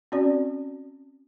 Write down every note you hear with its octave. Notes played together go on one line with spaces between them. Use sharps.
C4 C#4 F#4 D5